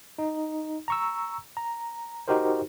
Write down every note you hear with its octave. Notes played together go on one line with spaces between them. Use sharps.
D#4
A#5 C#6 E6
A#5
D#4 F#4 G4 A#4 C5